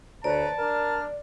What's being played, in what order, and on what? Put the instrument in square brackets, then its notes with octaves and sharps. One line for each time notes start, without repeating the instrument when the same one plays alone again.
[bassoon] D2 [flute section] B4 C#5 A#5 [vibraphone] D5 [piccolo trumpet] A5
[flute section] D4 F6 [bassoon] A#4